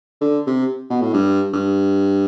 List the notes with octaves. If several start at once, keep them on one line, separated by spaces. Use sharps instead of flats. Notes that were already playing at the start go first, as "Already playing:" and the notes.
D3
C3
B2
A2
G2
G2